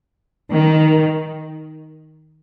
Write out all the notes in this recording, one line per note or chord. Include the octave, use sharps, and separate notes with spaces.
D#3